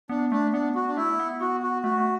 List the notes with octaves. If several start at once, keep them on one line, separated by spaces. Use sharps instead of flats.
B3 D4
A3 D4
B3 D4
F#4
D4
A3 E4
B3
B3 F#4
F#4
A3 F#4
A3